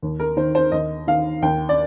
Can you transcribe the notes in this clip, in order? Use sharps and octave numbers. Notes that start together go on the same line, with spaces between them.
D#2
A#4
D#3 C5
C5
D#2 D#5
D#3 F5
D#2 G5
D5